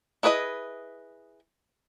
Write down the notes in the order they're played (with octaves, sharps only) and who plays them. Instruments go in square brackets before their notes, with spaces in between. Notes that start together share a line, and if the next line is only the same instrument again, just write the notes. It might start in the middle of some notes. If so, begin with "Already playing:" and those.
[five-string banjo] E4 G#4 B4 D5 D#5